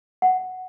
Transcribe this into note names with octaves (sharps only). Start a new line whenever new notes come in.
F#5